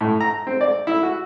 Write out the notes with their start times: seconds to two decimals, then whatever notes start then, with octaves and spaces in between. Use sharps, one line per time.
0.01 A2
0.20 A#5
0.47 C4
0.61 D5
0.87 E4
1.03 F#4